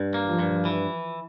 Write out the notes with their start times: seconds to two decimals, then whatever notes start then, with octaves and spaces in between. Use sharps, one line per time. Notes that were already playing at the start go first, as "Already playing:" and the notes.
Already playing: G2
0.14 A#3
0.27 F3
0.39 G2
0.65 E3